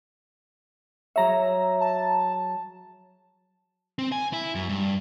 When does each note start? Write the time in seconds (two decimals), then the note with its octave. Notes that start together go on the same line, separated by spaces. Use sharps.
1.16 F#3 G#4 C#5 E5 A#5
1.80 A5
3.99 C4
4.12 G#5
4.33 E4
4.55 F#2
4.69 G2